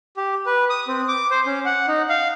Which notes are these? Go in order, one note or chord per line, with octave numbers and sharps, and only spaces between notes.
G4
B4
D#6
C4
D6
C5
C#4
F#5
D#4
F5